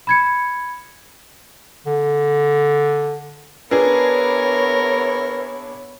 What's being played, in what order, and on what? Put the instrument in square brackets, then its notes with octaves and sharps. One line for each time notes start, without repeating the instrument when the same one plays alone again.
[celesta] B5 G#6 C#7
[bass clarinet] D3
[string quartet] B3 E4 C#5 [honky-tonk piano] D4 G#4 [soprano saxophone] A#4 [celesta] B4